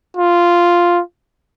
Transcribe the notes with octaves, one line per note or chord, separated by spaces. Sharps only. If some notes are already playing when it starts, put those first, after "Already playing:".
F4